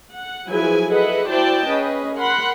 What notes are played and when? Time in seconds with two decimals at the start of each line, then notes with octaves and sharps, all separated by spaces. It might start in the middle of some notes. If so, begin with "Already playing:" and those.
0.14 F#5
0.48 F3 F#3 E4 G#4 B4 G#5
0.88 G#4 A4 B4 D#5 E5 F#5
1.29 E4 F#4 C5 D5 G5 A5
1.67 C#4 G#4 B4 D#5
2.17 A#4 F#5 B5 C6